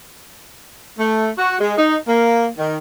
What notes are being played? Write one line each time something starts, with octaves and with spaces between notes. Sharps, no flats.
A3
F#4
G#3
D#4
A#3
D#3